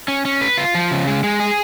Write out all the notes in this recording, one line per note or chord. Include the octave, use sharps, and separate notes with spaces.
C#4
C#4
B4
F4
F3
C#3
G#3
G#3
G#4